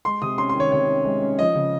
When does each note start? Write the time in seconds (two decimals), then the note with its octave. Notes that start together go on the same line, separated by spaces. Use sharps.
0.05 G#3 C6
0.22 C3 D#6
0.38 C#4 C6
0.49 C6
0.55 D#3
0.60 C#5
0.72 C3 C#5
0.88 C#4
1.05 G#3
1.21 C#4
1.39 F3 D#5
1.55 C#3